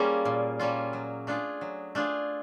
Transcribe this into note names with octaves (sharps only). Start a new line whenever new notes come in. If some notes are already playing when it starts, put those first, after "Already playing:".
Already playing: G3 A#3 C#4 F4 G#4
A#2
G3 A#3 C#4 F4
F#3
A3 D4 F4 G#4
F#3
A3 D4 F4 G#4